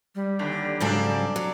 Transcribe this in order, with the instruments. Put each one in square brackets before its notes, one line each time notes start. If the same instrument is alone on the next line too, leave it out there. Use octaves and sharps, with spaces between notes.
[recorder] G3
[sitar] D#2 D3
[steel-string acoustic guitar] G#2 C#3 F#3 [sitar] C4 D4 A4
[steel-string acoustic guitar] F#3